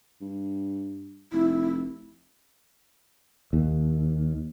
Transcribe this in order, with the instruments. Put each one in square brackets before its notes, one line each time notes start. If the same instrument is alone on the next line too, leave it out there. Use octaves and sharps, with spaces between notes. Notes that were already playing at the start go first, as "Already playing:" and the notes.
[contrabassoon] G2
[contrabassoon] F1 [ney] E4
[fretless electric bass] D#2